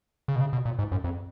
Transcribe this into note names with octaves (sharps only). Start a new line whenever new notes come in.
C#3
B2
C#3
B2
A#2
G#2
F#2
F2